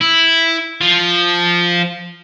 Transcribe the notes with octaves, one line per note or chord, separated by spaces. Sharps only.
E4
F3